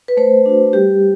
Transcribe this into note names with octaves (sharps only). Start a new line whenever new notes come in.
B4
A3 C5
D4 F#4
G3 G4